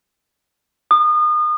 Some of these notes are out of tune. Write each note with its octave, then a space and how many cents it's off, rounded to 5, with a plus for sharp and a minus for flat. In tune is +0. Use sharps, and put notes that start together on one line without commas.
D#6 -35